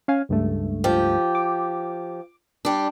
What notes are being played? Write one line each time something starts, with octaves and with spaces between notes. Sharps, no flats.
C#4 F5 G#5
C#2 G2 A3
F3 G4
D6
G3 D4